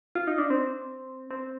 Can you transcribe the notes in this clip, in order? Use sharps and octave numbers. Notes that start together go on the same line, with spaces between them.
F4
D#4
D4
C4
C4